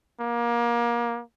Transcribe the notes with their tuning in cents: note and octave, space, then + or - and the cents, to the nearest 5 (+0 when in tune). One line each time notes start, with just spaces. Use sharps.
A#3 +25